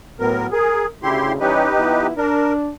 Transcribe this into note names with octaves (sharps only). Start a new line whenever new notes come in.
A2 F#3 B3 A#4
G#4 A#4
D2 C#3 E4 G4 C6
E3 G3 C#4 D#4 G4 B4
F3 B3 E4
D4 A#4